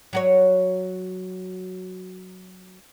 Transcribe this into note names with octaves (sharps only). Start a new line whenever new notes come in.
F#3 F#4 C#5